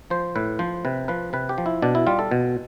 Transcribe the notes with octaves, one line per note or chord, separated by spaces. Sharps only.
F3 C5
A2 B4
F3 C5
C3 B4
F3 B4
C3 B4
G4
F3
E4
B2 D4
E4
G3 F4
A4
B2